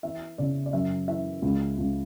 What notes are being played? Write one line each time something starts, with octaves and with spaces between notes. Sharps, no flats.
E3 E5
C#3 D5
D5
F#2 E5
E3 E5
C#2
C#2